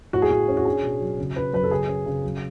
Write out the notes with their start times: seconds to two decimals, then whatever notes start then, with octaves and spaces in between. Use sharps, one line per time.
0.13 A2 F#4
0.22 G#4
0.30 A2 F#4
0.48 C#4
0.57 F#4
0.65 D4 G#4
0.83 B2
1.00 F#3
1.18 C#3
1.36 C#4 B4
1.53 F#2 B4
1.64 A4
1.71 C#3 G#4
1.88 C#4
2.06 C#3
2.23 F#3